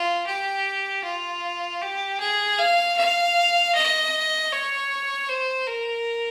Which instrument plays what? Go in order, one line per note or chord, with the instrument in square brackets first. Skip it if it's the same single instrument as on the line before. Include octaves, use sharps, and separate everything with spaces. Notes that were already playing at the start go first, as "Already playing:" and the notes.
Already playing: [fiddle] F4
G4
F4
G4
G#4
F5
F5
D#5
C#5
C5
A#4